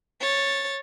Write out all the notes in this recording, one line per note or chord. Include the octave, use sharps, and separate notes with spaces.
C#5 A6